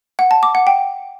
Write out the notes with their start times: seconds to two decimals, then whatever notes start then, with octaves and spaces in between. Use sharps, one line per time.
0.19 F#5
0.31 A5
0.43 D6
0.55 F#5
0.67 G5